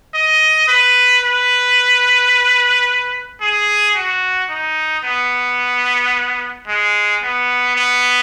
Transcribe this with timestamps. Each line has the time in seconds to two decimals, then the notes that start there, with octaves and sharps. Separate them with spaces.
0.14 D#5
0.68 B4
1.23 B4
3.41 G#4
3.95 F#4
4.49 D#4
5.04 B3
6.67 G#3
7.22 B3
7.76 B3